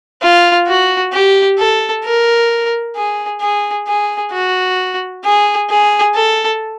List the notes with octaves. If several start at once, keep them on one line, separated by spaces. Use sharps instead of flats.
F4
F#4
G4
A4
A#4
G#4
G#4
G#4
F#4
G#4
G#4
A4